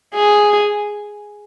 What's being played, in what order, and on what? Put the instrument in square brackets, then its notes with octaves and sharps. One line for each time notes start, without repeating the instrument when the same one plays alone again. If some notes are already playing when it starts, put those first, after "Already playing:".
[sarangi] G#4